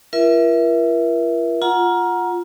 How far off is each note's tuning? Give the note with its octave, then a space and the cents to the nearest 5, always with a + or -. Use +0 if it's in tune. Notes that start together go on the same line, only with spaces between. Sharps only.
F4 -45 A#4 +40 E5 +0
F4 +0 F#5 -10 A#5 +20